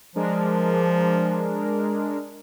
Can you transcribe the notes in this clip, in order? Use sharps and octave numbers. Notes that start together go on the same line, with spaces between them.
F3 G#3 D4 A#4